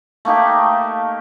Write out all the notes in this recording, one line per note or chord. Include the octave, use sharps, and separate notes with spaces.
A3 A#3 D#4 G4